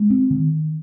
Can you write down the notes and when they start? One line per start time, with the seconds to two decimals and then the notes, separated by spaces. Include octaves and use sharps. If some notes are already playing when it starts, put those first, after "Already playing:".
Already playing: G#3
0.10 C4
0.31 D#3